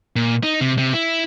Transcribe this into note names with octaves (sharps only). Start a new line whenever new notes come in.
A#2
D#4
C3
C3
E4